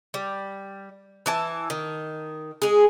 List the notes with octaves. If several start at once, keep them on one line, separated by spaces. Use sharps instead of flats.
G3
E3 E4 A5
D#3
G#3 G#4